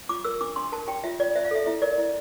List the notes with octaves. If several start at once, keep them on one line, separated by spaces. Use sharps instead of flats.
F4 D6
A#4 E6
D4 D6
D4 C6
A#4 A5
G4 G5
F4 E5
F4 D5
C5 E5
F5
A4 E5
E4 E5
A#4 D5
E4